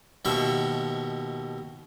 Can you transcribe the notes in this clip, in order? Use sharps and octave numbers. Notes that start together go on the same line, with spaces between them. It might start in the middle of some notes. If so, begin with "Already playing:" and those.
D#2 B2 F3 E5 C#6